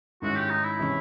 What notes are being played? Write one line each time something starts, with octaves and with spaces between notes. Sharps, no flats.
G#2 D#3 G#3 C#4 E4 F#4
G4
D#4
E4
C3 E3 G#3 C#4